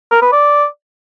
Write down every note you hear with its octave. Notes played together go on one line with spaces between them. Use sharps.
A#4
B4
D5